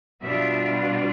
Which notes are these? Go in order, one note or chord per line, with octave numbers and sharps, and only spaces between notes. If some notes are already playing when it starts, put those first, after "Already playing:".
B2 G3 D4 F4 E5